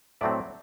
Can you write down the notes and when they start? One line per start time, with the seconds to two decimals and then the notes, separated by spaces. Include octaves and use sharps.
0.21 A2 F#3 A3 C4 D5 E5